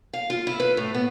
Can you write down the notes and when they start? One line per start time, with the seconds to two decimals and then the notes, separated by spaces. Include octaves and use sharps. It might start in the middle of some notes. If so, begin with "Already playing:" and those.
0.13 F5
0.30 F4
0.47 E4
0.60 B4
0.77 A2
0.94 B3